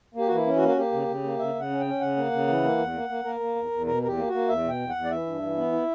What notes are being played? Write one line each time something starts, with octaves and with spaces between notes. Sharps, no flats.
A#3 G4
E3 F#4
E4
C#4
F#4
A#3
F#4
A#3 G4
C#3
C#3
A#3
C#3 E5
C#3 F#5
C#4
G5
C#4
C#3 F#5
A#3
C#3
E3
A#3
E2
A#3
A#3
A#3 A#4
A#3
E2
E2
B2 A#4
E2 A#4
G4
A#3
F#4
A#3
E2 E5
B2
G5
E2
F#5
E2
D5
E3 E5
G2
E3
B3
E4